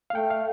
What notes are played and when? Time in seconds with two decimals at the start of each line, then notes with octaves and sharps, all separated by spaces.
0.10 F5
0.15 A3 G5
0.30 F5